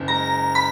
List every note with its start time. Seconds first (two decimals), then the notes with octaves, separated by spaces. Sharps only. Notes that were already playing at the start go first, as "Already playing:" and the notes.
Already playing: F#1
0.08 G#3 A#5
0.55 B5